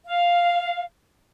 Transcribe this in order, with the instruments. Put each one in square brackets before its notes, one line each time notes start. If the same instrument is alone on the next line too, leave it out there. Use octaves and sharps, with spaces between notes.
[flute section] F5